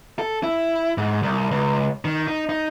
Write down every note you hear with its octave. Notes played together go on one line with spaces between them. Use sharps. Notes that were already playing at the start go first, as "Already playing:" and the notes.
A4
E4
G#2
C2
C#2
D#3
D#4
D#4